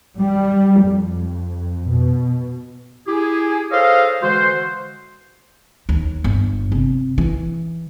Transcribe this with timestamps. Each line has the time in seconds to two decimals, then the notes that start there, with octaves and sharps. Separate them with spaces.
0.20 G3
0.84 F2
1.90 B2
3.06 E4 G4 G#4
3.71 G#4 A4 C5 C#5 D#5 F5
4.22 D3 E3 G#3 F#4 C5
5.89 D#2
6.24 G1
6.72 C3
7.18 E3